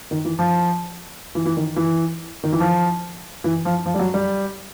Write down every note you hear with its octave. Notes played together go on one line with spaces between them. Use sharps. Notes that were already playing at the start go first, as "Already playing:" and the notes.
D#3
E3
F3
E3
E3
D#3
E3
D#3
E3
F3
E3
F3
F3
G3
F#3
G3